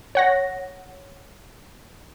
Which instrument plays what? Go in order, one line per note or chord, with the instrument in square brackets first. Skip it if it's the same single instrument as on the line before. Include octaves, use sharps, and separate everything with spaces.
[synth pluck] C#5 F#5 A#6